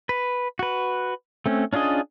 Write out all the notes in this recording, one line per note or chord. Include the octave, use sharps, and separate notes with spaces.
B4
F#4 B4
A3 C4 C#4
C#4 D4 F4 G#4 D#5